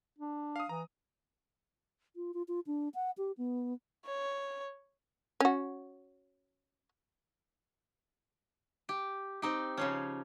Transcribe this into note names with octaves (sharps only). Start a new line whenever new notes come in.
D4
F5 D#6
E3 A#5
F4
F4
F4
D4
F#5
G4
B3
C#5
C#4 F#4
G4
C4 D#4 G4
C#3 F3 C#4